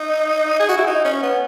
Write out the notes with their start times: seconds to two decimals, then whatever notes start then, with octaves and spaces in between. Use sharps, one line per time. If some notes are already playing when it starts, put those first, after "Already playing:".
Already playing: D#4
0.60 G#4
0.69 F#4
0.78 E4
0.87 D#4
1.05 C#4
1.23 B3